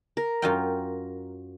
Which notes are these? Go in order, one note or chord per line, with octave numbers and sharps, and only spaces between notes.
A#4
F#2 F4 G5